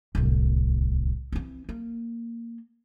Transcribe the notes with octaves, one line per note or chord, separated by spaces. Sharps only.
D1 C2
E3 C4
A#3